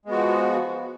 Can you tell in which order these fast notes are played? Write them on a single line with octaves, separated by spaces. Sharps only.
G#3 B3 F#4 F3